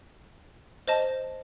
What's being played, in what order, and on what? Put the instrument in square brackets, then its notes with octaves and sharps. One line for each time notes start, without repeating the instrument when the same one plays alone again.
[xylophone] C5 D#5 A5